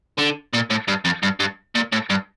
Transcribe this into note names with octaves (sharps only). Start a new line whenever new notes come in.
D3
A#2
A2
G2
F2
G2
G2
A#2
A2
G2